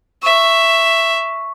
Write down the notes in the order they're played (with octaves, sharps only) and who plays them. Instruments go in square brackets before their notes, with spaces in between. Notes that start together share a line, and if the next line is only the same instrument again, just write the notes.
[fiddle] E5 [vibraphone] C#6